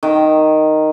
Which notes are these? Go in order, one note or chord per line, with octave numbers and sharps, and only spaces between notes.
D#3